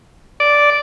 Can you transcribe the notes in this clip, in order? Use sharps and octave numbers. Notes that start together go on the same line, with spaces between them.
D5